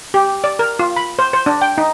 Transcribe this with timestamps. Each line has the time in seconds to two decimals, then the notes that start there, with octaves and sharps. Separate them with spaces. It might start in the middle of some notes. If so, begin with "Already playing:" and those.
0.14 G4
0.44 D5
0.59 A#4
0.79 F4
0.96 B5
1.19 C5
1.33 C5
1.46 D4
1.62 G5
1.78 D#4